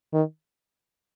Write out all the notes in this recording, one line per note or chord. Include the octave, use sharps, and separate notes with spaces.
D#3